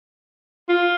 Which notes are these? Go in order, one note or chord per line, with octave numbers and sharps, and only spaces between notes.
F4